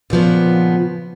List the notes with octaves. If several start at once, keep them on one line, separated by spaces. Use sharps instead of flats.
A#2 C#3 F3 B3